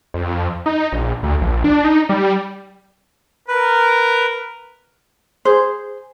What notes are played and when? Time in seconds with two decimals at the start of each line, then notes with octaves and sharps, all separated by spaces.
0.14 F2
0.66 D#4
0.92 A#1
1.23 D2
1.41 A#1
1.64 D4
1.84 D#4
2.09 G3
3.48 A#4 B4
5.45 G#4 C5